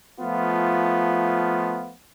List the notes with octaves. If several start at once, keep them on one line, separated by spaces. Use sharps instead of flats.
F3 A3 B3 F4